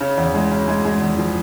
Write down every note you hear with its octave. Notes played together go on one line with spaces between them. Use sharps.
C#3
E2
G#3
C#3
G#3
G#3
E2
F3